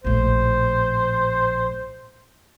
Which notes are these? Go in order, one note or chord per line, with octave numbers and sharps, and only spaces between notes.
A#1 A2 C5